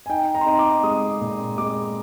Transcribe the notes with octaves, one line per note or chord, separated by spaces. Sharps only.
G#5
D#4 G5
A#5
C6
D#4 A#5
D6
G#3 D#6
A#2
G#3 D6